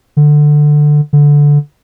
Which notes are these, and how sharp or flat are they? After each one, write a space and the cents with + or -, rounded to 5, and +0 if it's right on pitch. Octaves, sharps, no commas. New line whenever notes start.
D3 +15
D3 -10